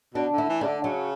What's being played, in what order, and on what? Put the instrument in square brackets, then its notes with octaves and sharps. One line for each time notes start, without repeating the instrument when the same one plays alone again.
[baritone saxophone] B2 [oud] D4
[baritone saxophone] D3
[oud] E4
[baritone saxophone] E3
[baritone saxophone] C#3 [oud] D4
[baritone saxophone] D3
[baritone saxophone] C#3 [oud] F#3